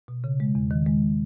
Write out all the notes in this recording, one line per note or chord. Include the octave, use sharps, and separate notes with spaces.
B2
C#3
G#3
E2
D#3
G#3